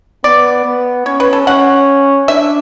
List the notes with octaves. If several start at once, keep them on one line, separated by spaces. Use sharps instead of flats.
B3 D5
B3
C#4 C#5
B4
A4
C#4 F#5
D4 E5